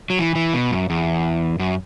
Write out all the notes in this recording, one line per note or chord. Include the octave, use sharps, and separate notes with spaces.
F#3
E3
E3
B2
F#2
E2
F#2